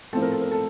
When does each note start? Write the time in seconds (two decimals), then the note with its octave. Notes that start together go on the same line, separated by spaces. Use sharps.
0.13 A2 F3 A3 C4 A4
0.22 A#4
0.32 A4
0.41 A#4
0.52 A4